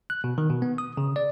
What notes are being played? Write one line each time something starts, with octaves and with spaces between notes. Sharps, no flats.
F#6
B2
D#3
B2
B3
D#6
C#3
D5